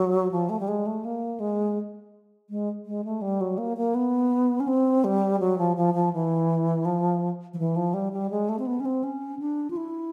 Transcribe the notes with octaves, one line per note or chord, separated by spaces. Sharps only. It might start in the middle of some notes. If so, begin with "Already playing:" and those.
Already playing: F#3
F3
A3
G3
G#3
A3
A#3
G#3
G#3
G#3
A3
G3
F#3
A#3
A#3
B3
C#4
C4
G3
F#3
F3
F3
F3
E3
F3
F3
E3
F3
G3
G3
G#3
A3
C4
B3
C#4
C4
C#4
D4
F4
E4